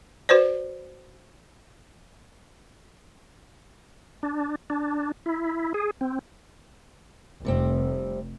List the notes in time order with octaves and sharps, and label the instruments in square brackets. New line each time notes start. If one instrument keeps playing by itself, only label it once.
[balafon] F#4 B4 C5 D5
[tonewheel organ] D4
D4
E4
G#4
C4
[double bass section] F1 [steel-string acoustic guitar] C3 G3 C4